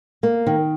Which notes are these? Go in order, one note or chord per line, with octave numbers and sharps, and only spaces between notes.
A#3
D#3